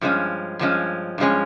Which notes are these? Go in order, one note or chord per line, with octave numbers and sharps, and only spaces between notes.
G2 F3 G#3 C#4
G2 F3 G#3 C#4
G2 F3 G#3 C#4